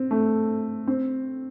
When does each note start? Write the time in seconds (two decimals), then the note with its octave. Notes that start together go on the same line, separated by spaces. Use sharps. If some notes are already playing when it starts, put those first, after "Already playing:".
Already playing: C4
0.11 A3
0.87 C4